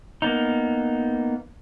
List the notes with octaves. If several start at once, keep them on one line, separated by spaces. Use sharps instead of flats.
A#3 B3 D#4